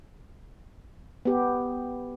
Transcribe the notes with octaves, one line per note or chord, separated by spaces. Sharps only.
B3 G4